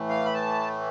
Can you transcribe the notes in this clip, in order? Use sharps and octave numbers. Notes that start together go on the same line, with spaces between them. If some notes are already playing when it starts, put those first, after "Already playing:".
Already playing: A2 E3 A3
F5
B5
A5